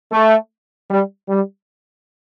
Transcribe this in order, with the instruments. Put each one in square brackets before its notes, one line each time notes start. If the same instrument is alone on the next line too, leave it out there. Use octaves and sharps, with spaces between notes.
[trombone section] A3
G3
G3